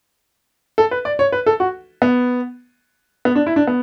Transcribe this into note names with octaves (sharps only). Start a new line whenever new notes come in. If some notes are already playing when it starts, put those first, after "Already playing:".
A4
B4
D5
C#5
B4
A4
F#4
B3
B3
D4
E4
D4
B3